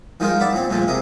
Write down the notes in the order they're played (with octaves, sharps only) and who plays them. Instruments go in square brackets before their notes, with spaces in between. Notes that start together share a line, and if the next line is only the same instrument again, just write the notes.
[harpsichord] D#3 F3 G#3 D#4 F4 A#4
D5 E5 F#5 B5
A#2 C4
A#2 F3 G#3 A3
C3 G#4 A#4 D#5